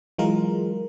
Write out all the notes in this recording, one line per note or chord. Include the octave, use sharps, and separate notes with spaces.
E3 F#3 G#3 F4 A#4